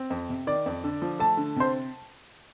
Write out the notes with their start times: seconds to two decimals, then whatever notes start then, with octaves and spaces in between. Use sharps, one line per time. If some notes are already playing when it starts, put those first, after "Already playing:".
Already playing: C4
0.10 F2
0.29 C3
0.47 D#3 D5
0.66 F2
0.84 D3
1.02 F3
1.19 A3 A5
1.37 D3
1.56 C3 C5